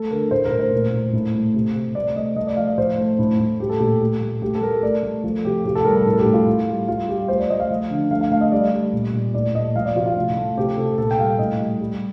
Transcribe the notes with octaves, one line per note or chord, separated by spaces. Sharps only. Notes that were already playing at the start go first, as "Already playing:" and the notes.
Already playing: A3 A4
D3 A#4
A2 C5
A#4
A2
C5
A#2
A#2
A2
A3
C3
C3
A3 D5
A3 D#5
A3 D#5
D5
F3 F5
D5
A2 C5
A3
A2
A2
A3 G4
A4
A#2 G4
A3
A3
A3 G4
A4
A3 A#4
A3 D5
A3
F3 A4
C3 G4
A2 G4
A4
G3 A#4
A4
A2
A4
G4
A2
F4
A2
G3
G3 F4
G3 G4
A3 C5
D5
A3 D#5
F5
F3
D3
A3 F5
F5
A3 F5
D#5
G3 D5
G3
A#2
A#2
A2 D5
A3 D#5
F3 F5
D5
C3 F4
F4
A2
A3
C3 G4
C3 A4
A#2 A4
G5
G3 F5
A2 D#5
G3
G3